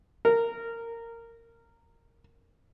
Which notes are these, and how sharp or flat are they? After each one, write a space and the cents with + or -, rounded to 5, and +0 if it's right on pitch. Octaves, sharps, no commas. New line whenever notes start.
A#4 -15